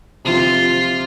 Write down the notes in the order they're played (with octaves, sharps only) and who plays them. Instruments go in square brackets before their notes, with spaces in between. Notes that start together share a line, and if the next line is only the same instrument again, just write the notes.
[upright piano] C3 F3 C4 [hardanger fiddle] F4